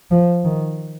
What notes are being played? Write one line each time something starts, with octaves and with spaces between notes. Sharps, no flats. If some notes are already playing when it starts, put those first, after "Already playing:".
F3
D#3